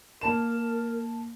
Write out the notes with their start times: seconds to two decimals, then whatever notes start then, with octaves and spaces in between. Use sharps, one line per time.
0.21 A#3 A#4 A5 E7